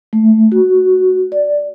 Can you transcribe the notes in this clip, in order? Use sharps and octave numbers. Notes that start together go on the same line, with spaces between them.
A3
F#4
D5